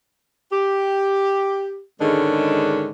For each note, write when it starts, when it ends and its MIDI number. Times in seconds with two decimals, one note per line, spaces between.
0.52 1.82 67
2.01 2.92 44
2.01 2.92 50
2.01 2.92 51
2.01 2.92 56
2.01 2.92 61
2.01 2.92 62